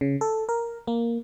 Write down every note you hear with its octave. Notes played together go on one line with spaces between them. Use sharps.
C#3
A4
A#4
A#3